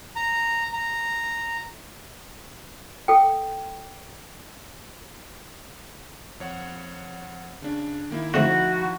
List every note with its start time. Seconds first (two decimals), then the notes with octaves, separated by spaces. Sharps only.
0.16 A#5
0.73 A#5
3.08 A4 G5
6.40 F2 C#5 F#5
7.62 C#3 D4
8.11 D#3 A#3 E4
8.34 D3 F3 A3 C4 D#4 E4 F#4